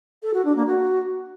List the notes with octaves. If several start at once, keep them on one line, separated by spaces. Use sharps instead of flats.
A4
F#4
D4
A#3
F#4